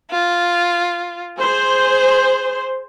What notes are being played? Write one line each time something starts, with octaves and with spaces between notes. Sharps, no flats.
F4
G#4 C5